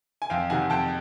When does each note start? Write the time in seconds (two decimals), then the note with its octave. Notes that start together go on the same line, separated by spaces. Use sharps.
0.22 G#5
0.30 F2 F5 G5
0.50 C3 D#3 F#5 G#5
0.70 F2 G5 A5